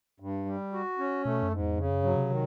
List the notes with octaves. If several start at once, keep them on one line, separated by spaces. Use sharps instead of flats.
G2
G3
F#4
C#4
B2 A3
F#2
G#2
E2
F2 C#3
F#2
G2 F#3
C3
D#3